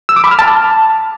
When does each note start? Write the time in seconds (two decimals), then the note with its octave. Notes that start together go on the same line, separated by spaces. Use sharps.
0.09 E6
0.16 D6
0.24 B5
0.31 F6
0.39 A5